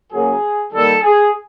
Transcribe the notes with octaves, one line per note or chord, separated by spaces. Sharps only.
C#3 F#3 A#3 G#4
D#3 G3 A#3 A4
G#4